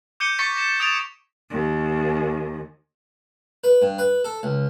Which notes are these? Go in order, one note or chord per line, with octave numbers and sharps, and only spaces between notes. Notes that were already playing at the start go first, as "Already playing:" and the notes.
D6 G6 C#7 D#7 G7
C#6 A6 B6 C#7 G7
A#6 E7
D#6 G#6 A6 D7 E7 F7
D#2
B4
G2
B4
A4
C#2